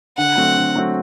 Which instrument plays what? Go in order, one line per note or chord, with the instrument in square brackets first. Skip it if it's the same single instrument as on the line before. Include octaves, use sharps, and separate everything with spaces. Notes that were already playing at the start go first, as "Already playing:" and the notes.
[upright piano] D3 [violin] F#5
[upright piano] F#3 A3 C4 F#4
D3
F#3 A3 C4 F#4